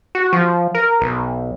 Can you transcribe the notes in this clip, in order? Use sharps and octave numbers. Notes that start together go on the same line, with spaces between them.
F#4
F3
A#4
B1